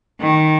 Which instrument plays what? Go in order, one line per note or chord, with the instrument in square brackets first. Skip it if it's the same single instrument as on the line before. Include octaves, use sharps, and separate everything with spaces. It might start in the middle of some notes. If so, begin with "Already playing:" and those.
[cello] D#3